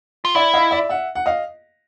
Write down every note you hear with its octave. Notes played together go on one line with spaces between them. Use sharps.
F4
E4 D5 E5
D#5 F5
D5 E5
E5 F#5
F#5
D#5 F5